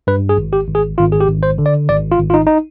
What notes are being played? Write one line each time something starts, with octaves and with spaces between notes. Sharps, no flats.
G2 B4
G#4
G#1
G4
G#1
G#4
G#1 F4
G#4
G4
G#1
C5
D3
D5
G#1 D5
F4
G#1
F4
D#4
D#4